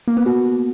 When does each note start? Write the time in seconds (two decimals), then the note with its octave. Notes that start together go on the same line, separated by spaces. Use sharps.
0.08 A#3
0.17 B3
0.26 F#4